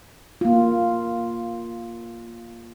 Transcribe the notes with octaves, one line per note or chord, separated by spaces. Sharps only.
A#3 F4